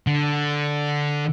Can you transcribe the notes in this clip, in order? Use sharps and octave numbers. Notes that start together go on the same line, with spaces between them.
D3